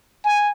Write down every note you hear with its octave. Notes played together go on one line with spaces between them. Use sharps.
G#5